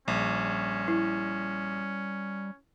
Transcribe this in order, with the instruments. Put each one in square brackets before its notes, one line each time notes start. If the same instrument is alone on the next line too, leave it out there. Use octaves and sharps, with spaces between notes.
[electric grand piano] A#1 [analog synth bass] G3 [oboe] C#4
[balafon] E4